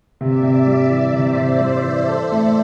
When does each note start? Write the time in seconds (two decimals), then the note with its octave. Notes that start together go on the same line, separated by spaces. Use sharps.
0.20 C3 D5 E5
0.43 C3
0.67 G3
0.90 E3
1.14 C3 C5 D5
1.37 C3
1.61 G3
1.84 E3
2.07 A4
2.31 A3